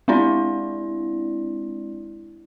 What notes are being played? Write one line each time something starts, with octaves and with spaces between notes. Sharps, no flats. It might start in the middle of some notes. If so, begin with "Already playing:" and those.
G#3 C4 D4 E4 D5